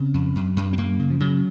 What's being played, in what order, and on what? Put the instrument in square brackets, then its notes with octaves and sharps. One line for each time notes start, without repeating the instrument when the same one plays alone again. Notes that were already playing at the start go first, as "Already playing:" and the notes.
Already playing: [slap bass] C#3 C4
F2
F#2
F#2
C4
F#2 A#3
C#3
F3
C#3 F#3